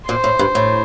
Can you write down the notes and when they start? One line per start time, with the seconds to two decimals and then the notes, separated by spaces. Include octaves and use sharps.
0.09 A#2 C5
0.24 A2
0.39 G2
0.55 A2